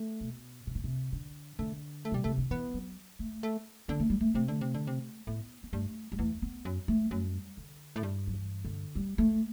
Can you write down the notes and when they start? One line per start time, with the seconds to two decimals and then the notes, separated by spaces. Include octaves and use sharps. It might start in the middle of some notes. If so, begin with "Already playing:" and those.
Already playing: A3
0.21 B2
0.67 C3
0.75 B2
0.84 C3
1.12 D3
1.59 D3 A3
2.05 A3
2.12 B2 G3
2.24 C3 A3
2.38 D3
2.51 E3 B3
2.74 F#3
3.19 A3
3.43 A3
3.88 D3 B3
4.00 A3
4.10 G3
4.21 A3
4.34 C3 A3
4.48 D3
4.61 C3
4.74 D3
4.87 C3
5.27 A2 B3
5.63 B3
5.73 G2 A3
6.12 G3
6.19 E2 A3
6.42 B3
6.65 F#2
6.88 A3
7.11 F#2 G3
7.57 D3
7.96 A2
8.03 G2
8.27 F#3
8.34 E3
8.65 D3
8.95 G3
9.18 A3